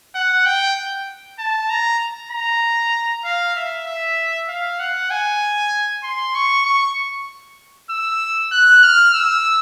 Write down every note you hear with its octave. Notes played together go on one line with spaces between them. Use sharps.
F#5
G5
A5
A#5
A#5
F5
E5
E5
F5
F#5
G#5
C6
C#6
C#6
E6
F#6
F6
E6